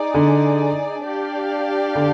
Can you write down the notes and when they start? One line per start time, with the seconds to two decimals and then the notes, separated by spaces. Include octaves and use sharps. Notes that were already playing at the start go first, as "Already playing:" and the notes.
Already playing: D#4 G#4 D5
0.14 D3
1.04 D4 G4 D5 F5
1.95 D3